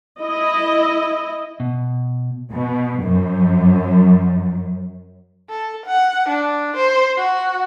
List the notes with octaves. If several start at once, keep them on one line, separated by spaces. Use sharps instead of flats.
E4 D#5
B2
B2
F#2
A4
F#5
D4
C5
F#4